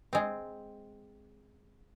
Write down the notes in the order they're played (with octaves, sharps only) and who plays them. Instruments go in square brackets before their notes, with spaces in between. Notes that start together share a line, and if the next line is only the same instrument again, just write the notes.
[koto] G#3 C4